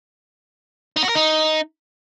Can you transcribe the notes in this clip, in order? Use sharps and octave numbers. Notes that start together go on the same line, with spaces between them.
D#4
F#4
A#4
D#4